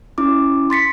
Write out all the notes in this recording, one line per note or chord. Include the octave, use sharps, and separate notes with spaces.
C#4 E4 D6
C6 A6 B6 C#7